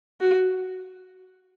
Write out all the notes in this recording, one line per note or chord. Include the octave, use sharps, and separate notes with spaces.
F#4